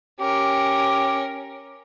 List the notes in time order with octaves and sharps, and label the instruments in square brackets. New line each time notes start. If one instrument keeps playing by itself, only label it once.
[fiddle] C#4 A#4 [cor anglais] G4